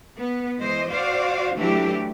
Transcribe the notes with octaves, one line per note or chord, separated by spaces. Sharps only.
B3
E3 G#3 C5 D#5
F#4 C5 D5 F5
E3 F#3 A3 D4 E4 G4